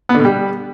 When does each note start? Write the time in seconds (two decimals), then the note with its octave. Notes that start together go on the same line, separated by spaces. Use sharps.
0.09 B3
0.14 D3
0.20 B2
0.25 G3